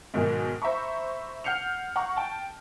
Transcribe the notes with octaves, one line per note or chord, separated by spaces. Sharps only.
G#2 B2 D#3 F#3 G#3
C5 E5 A#5 B5 C#6
F#5 F6 G6 C7 C#7 F7
F#5 A#5 C#6
G5 A5